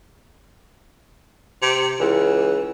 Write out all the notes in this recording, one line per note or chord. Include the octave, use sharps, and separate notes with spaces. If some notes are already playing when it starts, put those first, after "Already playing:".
C3
C#2 E3